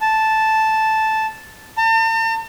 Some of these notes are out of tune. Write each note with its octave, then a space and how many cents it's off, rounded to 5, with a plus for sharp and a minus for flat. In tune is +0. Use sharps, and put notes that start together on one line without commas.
A5 -5
A5 +45